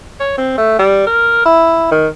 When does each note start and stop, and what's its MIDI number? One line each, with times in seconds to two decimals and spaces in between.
0.20 0.34 73
0.38 0.58 60
0.58 0.77 57
0.79 1.05 55
1.07 1.44 70
1.45 1.91 64
1.92 2.08 51